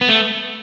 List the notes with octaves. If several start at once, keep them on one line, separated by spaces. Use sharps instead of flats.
B3
A3